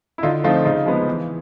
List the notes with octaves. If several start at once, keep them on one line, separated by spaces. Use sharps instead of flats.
E4
D3 D#4 F4
F3 A3 C4 D#4 F4
C#3 D#4
F3 G#3 B3
E3